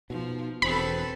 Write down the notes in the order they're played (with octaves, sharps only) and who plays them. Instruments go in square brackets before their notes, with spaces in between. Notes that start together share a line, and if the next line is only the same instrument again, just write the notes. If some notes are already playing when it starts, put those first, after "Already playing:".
[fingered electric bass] B2 [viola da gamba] F3 [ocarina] D#4
[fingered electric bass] E1 [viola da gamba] C4 A4 B4 [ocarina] C5 [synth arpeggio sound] B5